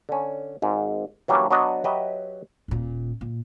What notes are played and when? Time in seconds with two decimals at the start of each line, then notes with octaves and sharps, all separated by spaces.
0.09 D3 C#4
0.62 G#1 G#2
1.28 E3 F#3 G3 A#3 C#4 D4
1.51 F#3 B3 D4 F#4 D#5 F#5
1.84 F#3 G4 B4 D#5 E5
2.68 D#1 A#2
3.21 A#2